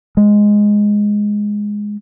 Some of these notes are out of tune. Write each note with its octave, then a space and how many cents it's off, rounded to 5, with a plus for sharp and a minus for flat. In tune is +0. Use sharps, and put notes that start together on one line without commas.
G#3 +0